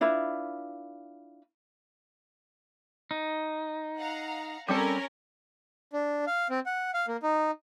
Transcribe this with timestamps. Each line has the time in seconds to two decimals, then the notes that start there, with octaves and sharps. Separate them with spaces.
0.01 D4 E4 F4 B4
3.11 D#4
3.98 F5 F#5 A#5
4.68 G3 C4 C#4 A4 A#4
5.93 D4
6.27 F5
6.50 C4
6.66 F#5
6.94 F5
7.08 A#3
7.23 D#4